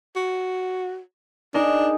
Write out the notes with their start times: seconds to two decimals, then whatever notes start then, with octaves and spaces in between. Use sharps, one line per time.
0.16 F#4
1.54 D4 D#4 G#4 A#4